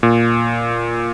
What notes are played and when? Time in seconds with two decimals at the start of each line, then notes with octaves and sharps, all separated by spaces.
0.03 A#2